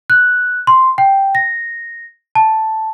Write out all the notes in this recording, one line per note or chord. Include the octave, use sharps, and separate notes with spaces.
F#6
C6
G5
A#6
A5